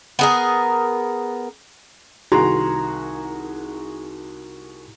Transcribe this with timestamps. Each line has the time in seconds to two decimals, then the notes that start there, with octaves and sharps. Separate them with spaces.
0.19 B3 G#4 A#4
2.32 C2 D#3 F#4 G#4 A#5 C6